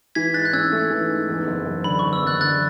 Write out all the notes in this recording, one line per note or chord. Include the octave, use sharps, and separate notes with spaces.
E3 G#6 B6
G#2 F#6 A6
F#6
C#4 E6 G#6
A3
E3
G#2
E2
F#1
F#1
D3 B5
E2 C#6
E6
F#1 F#6 A6
D3 F#6 A6